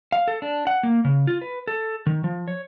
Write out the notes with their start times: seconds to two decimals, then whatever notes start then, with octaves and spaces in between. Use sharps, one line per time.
0.12 F5
0.28 A4
0.42 D4
0.67 F#5
0.83 A#3
1.05 C#3
1.27 F4
1.41 B4
1.67 A4
2.07 D#3
2.24 F3
2.48 C#5